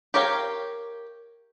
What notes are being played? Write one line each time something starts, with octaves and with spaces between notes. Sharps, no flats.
G4 A#4 C#5 F5 G5